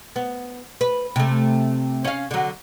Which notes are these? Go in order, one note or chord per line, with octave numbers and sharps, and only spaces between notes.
B3
B4
C3 A3
C#4 F5
D3 F#3